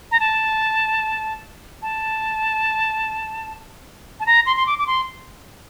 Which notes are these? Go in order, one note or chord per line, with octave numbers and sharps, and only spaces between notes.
A#5
A5
A5
A5
A#5
C6
C6
D6
D6
C6